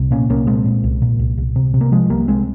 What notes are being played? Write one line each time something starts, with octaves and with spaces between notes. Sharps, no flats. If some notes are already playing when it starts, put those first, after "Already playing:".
Already playing: C2
A#2 A#3 C#4
C2 A#3 C#4
A#2 G#3 C4
A#2
C2
A#2
C2
C2
C3
C3
A#3
C3 F3 G#3
C2 G3 A#3
C2 G#3 C4